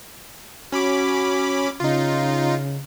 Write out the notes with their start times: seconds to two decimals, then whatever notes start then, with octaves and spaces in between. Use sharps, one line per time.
0.72 C#4 F#4 B5 D6
1.80 C#3 D#4 F4